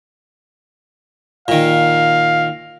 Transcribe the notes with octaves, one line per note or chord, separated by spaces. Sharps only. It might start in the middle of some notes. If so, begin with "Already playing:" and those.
A#2 D#3 F5